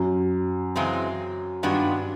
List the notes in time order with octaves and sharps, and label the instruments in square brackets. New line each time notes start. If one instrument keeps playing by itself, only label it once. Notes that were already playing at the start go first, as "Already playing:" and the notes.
Already playing: [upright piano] F#2
[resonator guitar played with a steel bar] C#3 E3 G#3 C4
[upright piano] G2 [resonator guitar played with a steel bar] D#3 G#3 B3 D4 F4